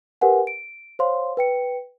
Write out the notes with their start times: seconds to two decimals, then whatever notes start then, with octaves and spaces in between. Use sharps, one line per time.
0.21 G4 A#4 B4 F#5 G#5
0.47 D7
0.99 C5 C#5 F5 C6
1.37 B4 G5 C#7